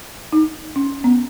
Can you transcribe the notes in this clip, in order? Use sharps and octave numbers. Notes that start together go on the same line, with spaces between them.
D#4
C#4
B3